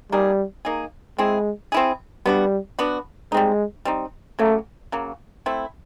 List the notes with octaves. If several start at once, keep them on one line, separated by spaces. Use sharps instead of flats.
G3 A#3 D#4 G#4
A#3 D#4 G#4
G#3 C4 E4 G#4
C4 E4 G#4
G3 B3 D4 F#4
B3 D4 F#4
G3 G#3 C4 D#4
G3 C4 D#4
C#3 F#3 A3 A#3
C#3 F#3 A#3
A3 C4 E4